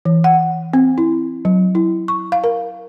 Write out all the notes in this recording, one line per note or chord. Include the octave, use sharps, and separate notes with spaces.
E3
F#5
C4
E4
F#3
E4
C#6
F5
A#4